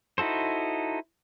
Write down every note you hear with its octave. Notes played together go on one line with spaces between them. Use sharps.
D#4 E4 F#4 A4 C5